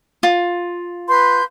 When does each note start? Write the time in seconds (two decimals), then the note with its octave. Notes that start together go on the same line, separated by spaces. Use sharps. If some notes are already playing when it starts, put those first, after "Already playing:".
0.23 F4
1.08 B4 C6 G6